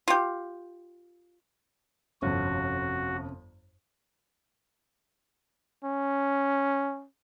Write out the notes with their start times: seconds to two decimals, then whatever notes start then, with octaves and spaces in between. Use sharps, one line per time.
0.08 F4 G4
2.22 G1 F2 C3 C#4 F#4
5.84 C#4